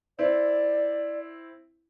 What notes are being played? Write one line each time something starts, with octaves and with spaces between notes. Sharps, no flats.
C4 E4 D5